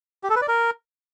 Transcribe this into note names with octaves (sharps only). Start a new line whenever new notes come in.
G4
A4
B4
D5
A#4